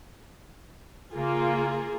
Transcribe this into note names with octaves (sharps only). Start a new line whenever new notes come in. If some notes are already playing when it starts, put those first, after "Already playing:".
C#3 A#3 F4 G#4